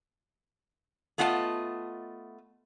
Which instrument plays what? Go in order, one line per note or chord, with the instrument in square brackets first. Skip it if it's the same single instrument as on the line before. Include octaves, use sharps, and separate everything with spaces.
[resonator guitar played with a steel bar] A3 B3 F4 D#5 F#5 A5